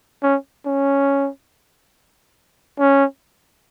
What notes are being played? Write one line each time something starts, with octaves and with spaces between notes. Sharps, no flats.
C#4
C#4
C#4